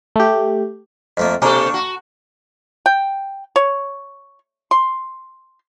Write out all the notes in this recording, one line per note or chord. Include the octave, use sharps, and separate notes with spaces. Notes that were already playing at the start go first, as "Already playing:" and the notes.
A3 G4
F2 A3 A#3 D#5
B2 A#3 D4 A4 G#5 A#5 C#6
F#4
G5
C#5
C6